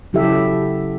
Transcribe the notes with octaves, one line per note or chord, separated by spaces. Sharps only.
C#3 F#3 E4 G4 A4 E5